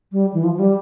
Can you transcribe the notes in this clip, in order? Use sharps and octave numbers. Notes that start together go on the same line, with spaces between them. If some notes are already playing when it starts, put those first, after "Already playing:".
G3
E3
F3
F3
G3